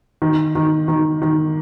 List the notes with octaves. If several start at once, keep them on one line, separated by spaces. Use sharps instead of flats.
D#3
D#3
D#3
D#3